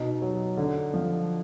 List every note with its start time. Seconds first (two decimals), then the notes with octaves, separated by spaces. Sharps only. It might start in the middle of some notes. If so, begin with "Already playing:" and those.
Already playing: B2 D#4
0.22 F#3
0.57 D3
0.93 F3